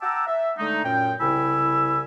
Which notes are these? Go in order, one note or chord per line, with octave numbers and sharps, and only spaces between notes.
F#5 G5 A5 A#5 D6 E6
E5
D3 G#3 A3 D#4
F#2 A#2 C#4 G5
C2 C#3 E4 G#5 B5 E6